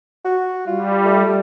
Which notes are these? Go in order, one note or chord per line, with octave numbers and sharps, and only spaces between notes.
F#4
G3 F4
A3